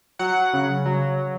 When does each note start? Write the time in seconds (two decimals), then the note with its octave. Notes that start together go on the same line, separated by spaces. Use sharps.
0.19 F#3 F#5
0.53 C#3
0.86 F#3